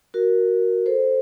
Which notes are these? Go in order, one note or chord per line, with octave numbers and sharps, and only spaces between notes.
F#4 A#4
A4 C5